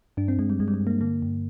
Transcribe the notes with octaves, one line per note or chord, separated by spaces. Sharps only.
G2 D4
C4
G2 G#3
G3
G2 G#3
G3
G#3
G2
A#3
D3 A#3
G2